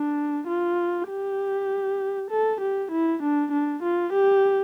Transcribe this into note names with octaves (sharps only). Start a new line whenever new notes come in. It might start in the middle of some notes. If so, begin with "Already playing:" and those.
Already playing: D4
F4
G4
A4
G4
E4
D4
D4
F4
G4